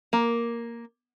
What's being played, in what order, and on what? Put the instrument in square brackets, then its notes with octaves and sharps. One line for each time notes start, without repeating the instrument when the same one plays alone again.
[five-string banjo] A#3